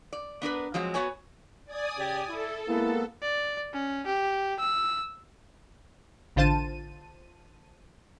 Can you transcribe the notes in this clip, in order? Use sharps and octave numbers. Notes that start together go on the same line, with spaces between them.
D5
B3 D4 A#4 B4
F3 F#3 G#3 C4
B3 F#4 C#5 G#5
D5 G#5 D#6
C#3 G4
E4 A4
G#3 A#3 B3 E4
D5
C#4
G4
E6
A1 D3 F4 C5 A5 D#7